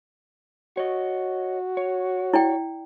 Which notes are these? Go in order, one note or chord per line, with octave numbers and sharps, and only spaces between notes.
F#4 C#5 D#5
C#5
E4 D5 G5